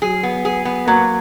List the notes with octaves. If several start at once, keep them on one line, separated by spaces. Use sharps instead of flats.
F#3 G#4
B3
G#4
B3
F#3 A#3